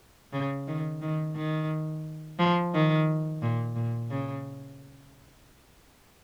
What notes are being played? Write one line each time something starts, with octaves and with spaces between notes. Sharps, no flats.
C#3
D#3
D#3
D#3
F3
D#3
A#2
A#2
C#3